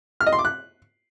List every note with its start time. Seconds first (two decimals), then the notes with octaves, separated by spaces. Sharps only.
0.21 F6
0.27 D#5
0.33 C6
0.39 D6
0.45 F#6